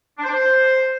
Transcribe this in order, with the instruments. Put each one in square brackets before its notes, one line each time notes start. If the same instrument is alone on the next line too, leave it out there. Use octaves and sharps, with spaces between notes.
[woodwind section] D4
C5
D4
C5